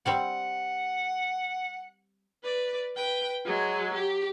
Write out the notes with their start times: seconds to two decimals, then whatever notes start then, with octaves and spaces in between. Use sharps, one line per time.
0.06 G3 C4 D5 F#5
2.43 B4 D5
2.95 B4 G5
3.45 F#3 G#3
3.94 G4